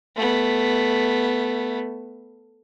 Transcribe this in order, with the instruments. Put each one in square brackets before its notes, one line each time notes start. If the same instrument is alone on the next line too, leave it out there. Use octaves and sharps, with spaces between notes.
[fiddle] A3 B3